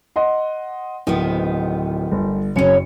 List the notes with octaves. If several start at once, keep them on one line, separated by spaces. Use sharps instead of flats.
D#5 F#5 C6
D1 D#3 F3 B3
G1
F#1 F#2 C#4 C#5 C#7